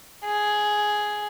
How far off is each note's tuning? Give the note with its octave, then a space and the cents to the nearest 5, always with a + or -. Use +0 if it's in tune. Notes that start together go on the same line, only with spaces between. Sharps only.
G#4 +5